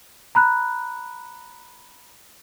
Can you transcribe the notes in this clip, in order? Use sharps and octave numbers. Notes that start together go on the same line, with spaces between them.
A#5 B5 F#6